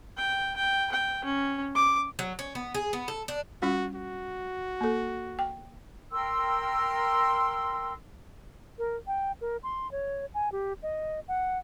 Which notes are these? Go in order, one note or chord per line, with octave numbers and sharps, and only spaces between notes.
G5
G5
G5
C#4
D6
F#3
C#4
B3
G#4
B3
A4
D4
G3 C#4 F4 F#4
F#4
A#3 A4
G5
A#4 G5 C6 E6
A#4
G5
A#4
C6
C#5
G#5
G4
D#5
F#5